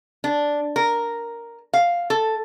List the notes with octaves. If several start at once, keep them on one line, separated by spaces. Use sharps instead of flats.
D4
A#4
F5
A4